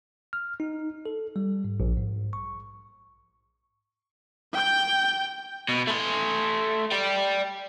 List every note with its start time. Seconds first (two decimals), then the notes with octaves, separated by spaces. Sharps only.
0.33 F6
0.60 D#4
1.06 A4
1.36 G3
1.64 G#2
1.80 A#1
1.97 G#2
2.33 C#6
4.53 G5 G6
5.69 B2
5.87 A3 C6
6.91 D5 G5